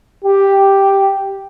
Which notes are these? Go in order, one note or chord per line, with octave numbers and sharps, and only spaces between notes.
G4